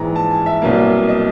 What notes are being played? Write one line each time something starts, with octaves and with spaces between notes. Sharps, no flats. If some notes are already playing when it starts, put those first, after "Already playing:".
Already playing: A#1 G#2 E3 G#3 A#5
A5
G#5
E5
C2 B2 F#3 A#3
D#5